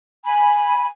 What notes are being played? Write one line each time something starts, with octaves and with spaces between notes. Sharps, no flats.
G#5 B5